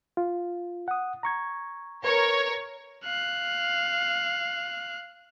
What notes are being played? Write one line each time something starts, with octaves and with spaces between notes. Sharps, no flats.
F4
F#5 D#6
A#5 C#6 G#6
A#4 B4 C#5
F5 F#6